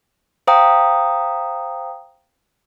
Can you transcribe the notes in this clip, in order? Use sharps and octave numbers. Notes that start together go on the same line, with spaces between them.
C5 F5 G5 A#5 D#6